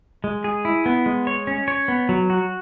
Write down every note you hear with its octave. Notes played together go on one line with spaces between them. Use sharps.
G#3
G#4
E4
B3
G#3
C#5
C#4
C#5
B3
F#3
F#4